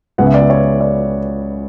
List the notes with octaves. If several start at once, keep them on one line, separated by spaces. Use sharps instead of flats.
C#2 C#3 G#3 B3 F#5
E5
D5
E5
C#5
D5